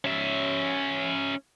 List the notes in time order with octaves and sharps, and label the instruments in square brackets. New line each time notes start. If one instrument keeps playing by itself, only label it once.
[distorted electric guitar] C#4 E5